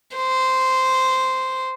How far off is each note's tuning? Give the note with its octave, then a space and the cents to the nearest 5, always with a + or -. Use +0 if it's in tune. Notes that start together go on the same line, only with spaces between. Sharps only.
C5 -10